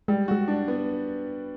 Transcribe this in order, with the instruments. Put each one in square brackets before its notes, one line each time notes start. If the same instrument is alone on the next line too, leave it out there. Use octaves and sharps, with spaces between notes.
[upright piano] G3 [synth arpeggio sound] G#3
[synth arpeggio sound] G#3 [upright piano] F#4
[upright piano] D4
B3